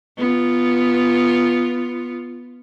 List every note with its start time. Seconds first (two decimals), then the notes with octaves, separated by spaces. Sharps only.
0.18 B3 F4